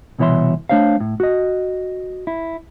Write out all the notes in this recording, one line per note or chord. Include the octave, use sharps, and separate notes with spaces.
C2 B2 E3 C#5 E5 C6
A3 D4 C5 C#5 F5
A2
F#4 D#5
E4